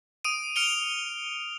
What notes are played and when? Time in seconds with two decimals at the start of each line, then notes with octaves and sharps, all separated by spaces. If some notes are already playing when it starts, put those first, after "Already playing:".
0.24 D#6 D7 D#7
0.56 F6 C#7 D7 F7 G7